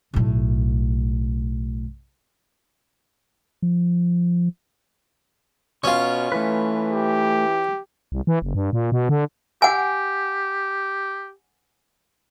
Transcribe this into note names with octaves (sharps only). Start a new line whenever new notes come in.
B1 A2
F3
B2 C#4 F4 C#6
E3 A3 B4
G4
C2
E3
F#1
G2
A#2
B2
D3
G4 F#5 G#5